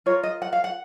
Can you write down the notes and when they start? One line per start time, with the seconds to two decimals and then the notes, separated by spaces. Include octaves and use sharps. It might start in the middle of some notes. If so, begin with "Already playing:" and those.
0.06 F4 A#4 C#5
0.23 D#5
0.42 F#5
0.53 F5
0.64 F#5